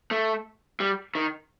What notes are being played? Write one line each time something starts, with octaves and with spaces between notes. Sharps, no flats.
A3
G3
D#3